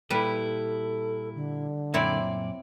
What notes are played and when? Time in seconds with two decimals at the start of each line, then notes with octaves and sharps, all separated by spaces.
0.10 A#2 G3 E4 A4 B4
1.35 D3
1.94 F#2 A#2 C4 E4 C#5 D5